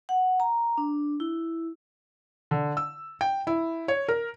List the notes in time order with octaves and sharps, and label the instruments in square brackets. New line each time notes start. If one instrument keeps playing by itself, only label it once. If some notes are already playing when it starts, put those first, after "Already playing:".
[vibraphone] F#5
A#5
D4
E4
[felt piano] D3
E6
G5
E4
C#5
A#4